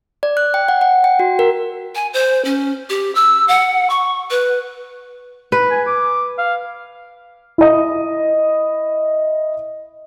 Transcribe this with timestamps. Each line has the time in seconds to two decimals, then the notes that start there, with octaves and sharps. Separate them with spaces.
0.23 D5
0.37 F#6
0.54 G5
0.68 F#5
0.81 F#5
1.04 G5
1.19 F#4
1.39 A#4
1.95 G#5
2.14 C5
2.45 C#4
2.90 G4
3.15 E6
3.48 F#5
3.90 C#6
4.30 B4
5.52 B4
5.71 G#5
5.87 D6
6.38 F5
7.58 E4 D#5